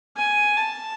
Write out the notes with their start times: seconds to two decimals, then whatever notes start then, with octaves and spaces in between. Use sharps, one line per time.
0.17 G#5
0.57 A5